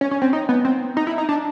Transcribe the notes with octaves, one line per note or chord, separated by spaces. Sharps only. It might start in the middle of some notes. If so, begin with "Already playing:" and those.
C#4
C#4
C4
D#4
B3
C4
D#4
E4
D#4
D4